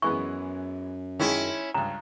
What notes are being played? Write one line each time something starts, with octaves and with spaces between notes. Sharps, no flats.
F#2 E3 G#3 B3 C#6
D#3 G#3 C#4 E4
C#2 G2 A#5